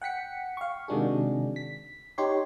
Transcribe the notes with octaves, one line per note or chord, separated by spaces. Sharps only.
F#5 G5 B6 C#7
F5 C#6
C3 D#3 G#3 D4 F#4 G#4
B6
D#4 G4 C#5 C6